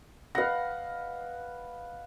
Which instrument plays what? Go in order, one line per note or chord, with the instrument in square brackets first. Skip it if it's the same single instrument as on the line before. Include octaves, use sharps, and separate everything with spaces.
[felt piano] B4 D#5 A#6 [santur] F5 F#5